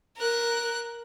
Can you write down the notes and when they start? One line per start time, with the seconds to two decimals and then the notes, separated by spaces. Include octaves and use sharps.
0.17 A#4 F#6